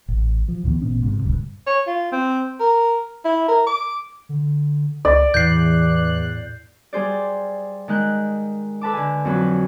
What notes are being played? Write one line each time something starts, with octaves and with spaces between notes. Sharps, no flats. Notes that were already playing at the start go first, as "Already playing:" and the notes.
A1
F3
D2 A2 E3 B3
A1 A#2 B3 C#4
G#2 C3
D#1 C#2 G2
C#5
F4
C4
A#4
E4
A#4
D6
D3
C#2 D5
E2 A2 F#6 G6 C7
G3 G#4 C5 D5
D#3 G#3 F#6 G6
A4 B4 A5 D6
D3 G#5
F2 F#3 B4